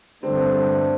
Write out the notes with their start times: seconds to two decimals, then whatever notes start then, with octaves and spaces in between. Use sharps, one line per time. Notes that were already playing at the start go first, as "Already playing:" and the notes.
0.23 G2 D3 A3 C4 D4 A4